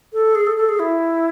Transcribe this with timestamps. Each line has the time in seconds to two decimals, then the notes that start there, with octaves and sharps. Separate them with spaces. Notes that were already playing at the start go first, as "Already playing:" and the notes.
0.13 A4
0.35 G#4
0.47 A4
0.57 A4
0.69 G#4
0.79 E4